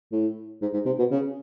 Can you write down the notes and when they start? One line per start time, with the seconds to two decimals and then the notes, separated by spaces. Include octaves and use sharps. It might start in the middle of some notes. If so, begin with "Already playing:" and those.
0.12 A2
0.62 G#2
0.73 G#2
0.86 C3
0.99 B2
1.11 C#3